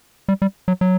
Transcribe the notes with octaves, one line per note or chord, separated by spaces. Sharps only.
G3
G3
F#3
F#3